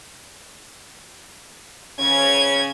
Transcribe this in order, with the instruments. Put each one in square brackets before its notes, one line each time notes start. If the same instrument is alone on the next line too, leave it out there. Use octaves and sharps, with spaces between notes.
[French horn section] C#3 C#4 [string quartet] G#6